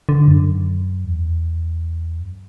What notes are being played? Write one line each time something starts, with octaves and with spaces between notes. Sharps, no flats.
D3
F#2
E2
F#2